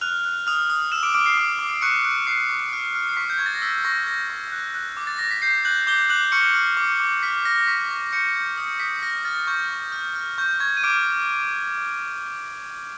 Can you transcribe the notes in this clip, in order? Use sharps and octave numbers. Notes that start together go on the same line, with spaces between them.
F6 F#6 F7
F#6
D#6 F6 F7
D#6
E6 F6 E7
D6 D7
D6 F6 D7
C7
D6 D7
D6
D7
C#6 F#6 C#7
F#6
C#6 C7
C#6
F6
F6
C7
C#6 B6
G6
C#6 G#6
A6
A#6
E6 B6
C#6 A#6
G6 A#6
C#6
F#6
F#6
D6
A6
D6 A#6
B6
G6 C7
F#6 G6 F#7
D6 G6 G7
D6 F#6 F#7
C#6 F6 C#7
F6
D6
D6
F6 B6
F6 A#6
A#6
C#6 B6
C#6
C#6 G6 C#7
G6
D#6
D#6 B6
F6 A#6
F6 A6
C#6 G6
C#6
F6
F6
C#6 G6
C#6 G#6
D#7
D6 F6 D7